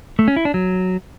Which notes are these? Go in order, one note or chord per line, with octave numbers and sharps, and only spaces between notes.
A3
C#4
E4
D4
F#3